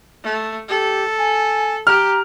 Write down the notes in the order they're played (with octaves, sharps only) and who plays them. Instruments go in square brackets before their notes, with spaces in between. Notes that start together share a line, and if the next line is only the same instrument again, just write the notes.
[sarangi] A3
[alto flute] G4 [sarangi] A4
[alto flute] G#5
[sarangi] G4 [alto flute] A#5 [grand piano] F6